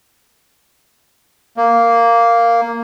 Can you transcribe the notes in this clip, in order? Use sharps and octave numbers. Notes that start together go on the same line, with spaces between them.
A#3